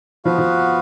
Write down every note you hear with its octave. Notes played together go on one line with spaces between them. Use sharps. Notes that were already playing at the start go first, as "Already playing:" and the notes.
F3 B3 F#4 B4 F5
F3